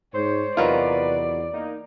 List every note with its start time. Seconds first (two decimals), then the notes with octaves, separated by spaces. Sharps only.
0.14 G#2 C5 C#5
0.57 E2 C3 D#3 F#3 F4 B4 D5
1.53 A#3 D#4